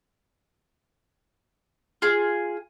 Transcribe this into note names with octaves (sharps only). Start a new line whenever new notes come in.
F4 G#4